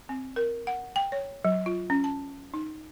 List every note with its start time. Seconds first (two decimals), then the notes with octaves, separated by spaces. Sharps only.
0.09 C4
0.36 A#4
0.67 F#5
0.96 G5
1.12 C#5
1.45 F#3
1.66 F4
1.90 C#4
2.04 A5
2.54 D#4